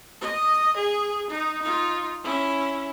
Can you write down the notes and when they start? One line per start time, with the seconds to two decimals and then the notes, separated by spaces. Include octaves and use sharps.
0.21 D#5
0.77 G#4
1.30 D#4
1.62 D#4 F4
2.24 C#4 E4